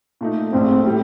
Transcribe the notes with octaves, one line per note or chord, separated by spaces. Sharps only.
A#2 A3 D#4
A#1 A2 A3 C4
A2 G3